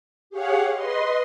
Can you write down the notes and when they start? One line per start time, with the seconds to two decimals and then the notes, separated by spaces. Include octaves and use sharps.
0.30 G4 G#4 C#5 F5 F#5
0.73 B4 D#5 C6